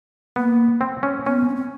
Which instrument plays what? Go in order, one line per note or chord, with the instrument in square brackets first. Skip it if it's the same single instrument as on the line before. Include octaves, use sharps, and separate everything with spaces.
[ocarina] A#3 [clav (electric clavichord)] B3
[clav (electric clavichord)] C4
C#4
[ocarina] B3 [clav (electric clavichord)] C#4
[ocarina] C#4
C4